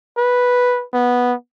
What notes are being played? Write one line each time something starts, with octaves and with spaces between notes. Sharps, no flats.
B4
B3